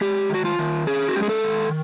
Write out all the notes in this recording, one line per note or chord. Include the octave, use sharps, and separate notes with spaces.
G#3 G4
D#3 F#4
F4
D#3
C#4 G#4
F#4
G#3 G4
G#4
A4
D#3